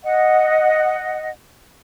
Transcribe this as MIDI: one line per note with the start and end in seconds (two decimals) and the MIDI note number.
0.03 1.29 75
0.03 1.29 78